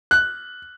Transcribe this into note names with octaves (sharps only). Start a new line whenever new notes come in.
F#6